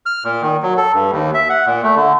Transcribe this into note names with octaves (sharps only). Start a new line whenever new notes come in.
F6
A#2
D#3
F#3
A4
G2
D#2
E5
F#5
A#2
A3
D3